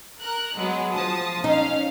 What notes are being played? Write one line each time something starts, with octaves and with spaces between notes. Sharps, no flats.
A#4 F#6
F#3 G#3 B3
F3 A5 D#6
C#4 D#4 F5